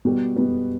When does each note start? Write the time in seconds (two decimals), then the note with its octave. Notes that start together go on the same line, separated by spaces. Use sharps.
0.05 B2 G3 B3
0.36 B2 G3 B3